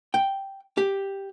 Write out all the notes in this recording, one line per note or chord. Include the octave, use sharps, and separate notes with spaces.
G5
G4